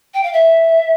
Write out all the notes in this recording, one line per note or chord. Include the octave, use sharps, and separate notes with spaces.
G5
F5
E5